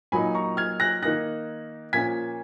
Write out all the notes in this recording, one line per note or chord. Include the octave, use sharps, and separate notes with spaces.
A#2 F#3 A#3 D#4 G#5 B5
A#5 C#6
F6 G#6
F#6 A#6
D#3 A#3 D#4 F#6 A#6
A#2 F3 A#3 C#4 G#6 B6